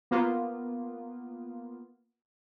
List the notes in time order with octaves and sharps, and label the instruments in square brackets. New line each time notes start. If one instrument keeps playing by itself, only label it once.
[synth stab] A#3 B3 F4